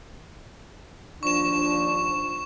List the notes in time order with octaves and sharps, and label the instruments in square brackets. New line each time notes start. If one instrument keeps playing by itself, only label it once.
[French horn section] D#2 F3 D4 [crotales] C#6 E7